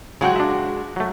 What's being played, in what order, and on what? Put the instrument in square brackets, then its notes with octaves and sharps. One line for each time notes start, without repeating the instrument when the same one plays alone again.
[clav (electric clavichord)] C#3 F#3 G5 [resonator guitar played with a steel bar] G#3 F#4
[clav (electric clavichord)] D4 E5
F#3 A3